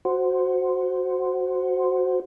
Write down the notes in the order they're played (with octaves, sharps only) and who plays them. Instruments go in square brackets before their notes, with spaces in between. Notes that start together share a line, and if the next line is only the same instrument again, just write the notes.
[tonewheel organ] F#4 C5